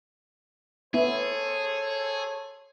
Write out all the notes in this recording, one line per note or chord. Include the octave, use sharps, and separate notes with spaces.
B3 E4 G#4 A4 C5 C#5